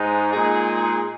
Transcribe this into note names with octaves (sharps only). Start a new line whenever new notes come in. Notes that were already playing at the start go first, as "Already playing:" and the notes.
Already playing: G#2 G#3 D#4
A#2 G#3 D#4 G#4